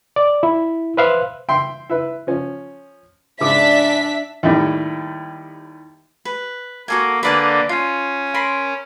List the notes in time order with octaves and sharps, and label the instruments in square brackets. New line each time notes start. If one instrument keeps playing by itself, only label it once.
[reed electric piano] D5
E4
B4 C5 E5 F5 F#6
[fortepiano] E5 G5 C6
E4 B4
F3 C#4
[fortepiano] G#2 C#3 D6 [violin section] D4 E5 B6
[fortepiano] D#2 A2 G3
[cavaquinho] B4
[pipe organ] A#3 [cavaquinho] F#4 A4 G#5
[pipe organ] D3 A#3 [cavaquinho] B4 D5 G#5
[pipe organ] C#4 [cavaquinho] F4
[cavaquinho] A#4 B5 C6